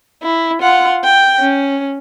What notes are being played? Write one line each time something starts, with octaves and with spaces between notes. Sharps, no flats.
E4
F4 F#5
G5
C#4